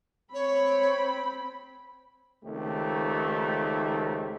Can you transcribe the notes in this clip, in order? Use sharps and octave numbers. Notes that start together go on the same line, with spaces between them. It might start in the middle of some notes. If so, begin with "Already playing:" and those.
C4 C#5 B5
C#2 D#3 A3 C4 D#4 G4